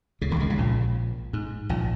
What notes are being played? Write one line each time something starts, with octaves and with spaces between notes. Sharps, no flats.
C#2 C#3
D#2 D#3
C#2 C#3
C#2 C#3
A#1 A#2
G#2
A#1 A#2